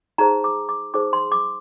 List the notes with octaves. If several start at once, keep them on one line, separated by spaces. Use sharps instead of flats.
D#4 G#4 C5 A#5
D6
D6
D#4 G#4 C5 D6
C6
D6